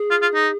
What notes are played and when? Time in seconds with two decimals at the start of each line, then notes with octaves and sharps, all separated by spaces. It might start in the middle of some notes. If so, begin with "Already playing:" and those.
Already playing: G#4
0.11 F4
0.22 F4
0.34 D#4